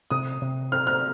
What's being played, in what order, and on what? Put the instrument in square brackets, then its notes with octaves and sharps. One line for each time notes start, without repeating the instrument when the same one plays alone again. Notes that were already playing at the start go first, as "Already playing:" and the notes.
[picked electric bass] C3 [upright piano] D#6
[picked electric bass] C3
[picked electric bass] C4 [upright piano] F6
[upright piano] F6